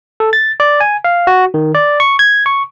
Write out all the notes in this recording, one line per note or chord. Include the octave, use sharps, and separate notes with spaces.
A4
A6
D5
G#5
F5
F#4
D#3
D5
C#6
G#6
C#6